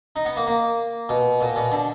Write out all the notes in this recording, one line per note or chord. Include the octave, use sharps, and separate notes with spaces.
D#4
B3
A#3
A#3
B2
A#2
B2
D3